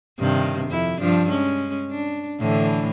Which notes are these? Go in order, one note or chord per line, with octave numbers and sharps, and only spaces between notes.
G2 C3 D#3
F2 E4
G2 F3 D4
G#3 C#4
D4
A2 D3 E3